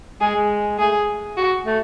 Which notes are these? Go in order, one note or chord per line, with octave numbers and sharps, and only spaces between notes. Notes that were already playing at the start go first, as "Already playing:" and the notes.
G#3 G#4
G#3
A3 G#4
F#4
A3